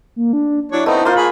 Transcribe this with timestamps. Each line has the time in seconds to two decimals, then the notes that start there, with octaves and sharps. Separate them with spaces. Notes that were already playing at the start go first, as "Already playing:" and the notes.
0.16 A#3
0.33 D4
0.72 F#3 D4 E4 C#5
0.86 A3 B3 C4 D#4
1.05 A#3 F4 C5
1.16 G#4 B5